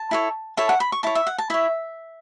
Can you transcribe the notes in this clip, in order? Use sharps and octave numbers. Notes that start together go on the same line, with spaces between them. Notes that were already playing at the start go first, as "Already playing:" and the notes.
Already playing: A5
E4 A4 C#5
E4 A4 C#5 A5
F#5
B5
C#6
E4 C#5 A5
E5
F#5
A5
E4 C#5 E5